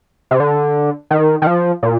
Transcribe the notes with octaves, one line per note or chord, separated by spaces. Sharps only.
C3
D3
D#3
D#3
F3
A#2